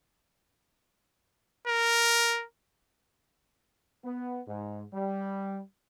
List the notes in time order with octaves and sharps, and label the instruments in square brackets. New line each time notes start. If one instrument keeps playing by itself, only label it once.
[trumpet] A#4
[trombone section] B3
G#2
G3